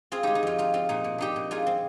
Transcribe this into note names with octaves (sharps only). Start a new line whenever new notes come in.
C4 F4 G#4
G#3 D#4 G4
D#4
F2 F4
D#4 F4
C4 F4
A#2 D#4
A#2
D4 D#4 G4
A#2
D#4 F4 G#4
C4